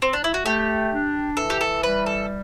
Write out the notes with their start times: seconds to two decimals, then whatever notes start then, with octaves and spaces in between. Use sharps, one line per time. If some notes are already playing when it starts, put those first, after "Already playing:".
0.02 C4
0.13 D4
0.24 E4
0.34 F#4
0.46 A3 G4
0.92 D4
1.37 E3 A4
1.50 G4
1.61 A4
1.83 G3 B4
2.06 A4